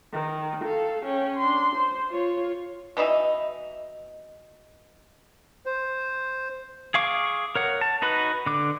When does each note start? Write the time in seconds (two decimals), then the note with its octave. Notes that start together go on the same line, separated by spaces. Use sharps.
0.13 D#3
0.64 A4 F5
1.05 C#4 G5
1.37 D4 C6
1.76 C5
2.10 F4 C#5
2.97 B2 E3 D#4 E5
5.66 C5
6.94 G#4 F5 C#6 D6
7.56 A#4 C#5 F#5
7.81 A5
8.02 D#4 F#4 B4 B5
8.46 D3 D6